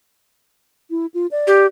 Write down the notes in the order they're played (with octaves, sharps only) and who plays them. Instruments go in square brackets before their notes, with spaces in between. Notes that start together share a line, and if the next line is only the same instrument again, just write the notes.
[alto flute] E4
F4
D5
[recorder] G4